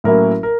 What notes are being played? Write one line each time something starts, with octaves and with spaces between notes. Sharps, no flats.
A2 F#3 A#3 C#4 E4 A#4
A#4